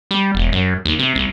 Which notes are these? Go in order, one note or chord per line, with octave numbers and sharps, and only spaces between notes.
G3
E1
F#2
D#2
C3
C2